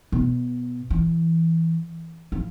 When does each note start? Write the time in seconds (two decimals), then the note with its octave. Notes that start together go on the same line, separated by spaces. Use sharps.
0.12 B2
0.90 E3
2.32 F3